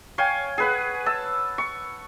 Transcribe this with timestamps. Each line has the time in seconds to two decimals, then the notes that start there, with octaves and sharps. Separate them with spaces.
0.18 C#5 F5 G5 G#5
0.58 G#4 B4 F#5
1.06 A5 E6
1.58 C#6